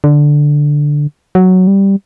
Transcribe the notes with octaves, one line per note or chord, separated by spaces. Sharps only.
D3
F#3
G3